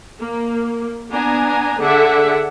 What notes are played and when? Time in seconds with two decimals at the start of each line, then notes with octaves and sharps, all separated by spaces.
0.20 A#3
1.11 B3 D4 G#5 A#5
1.80 D3 G#4 D5 E5 F#5